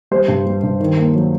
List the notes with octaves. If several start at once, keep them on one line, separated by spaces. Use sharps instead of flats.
G3 C5
G2
G3
G2
D#3
A#3
F#3